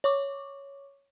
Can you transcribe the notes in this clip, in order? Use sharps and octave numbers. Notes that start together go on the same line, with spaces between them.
C#5 C#6 D6